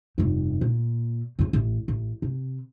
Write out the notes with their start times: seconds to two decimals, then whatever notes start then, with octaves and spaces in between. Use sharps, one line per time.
0.18 F1 G2
0.61 A#2
1.39 F2 C#3
1.53 A1
1.88 A1
2.22 C3